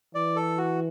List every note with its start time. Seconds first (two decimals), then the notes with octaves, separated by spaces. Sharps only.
0.15 E3 D5
0.36 A4
0.58 F#4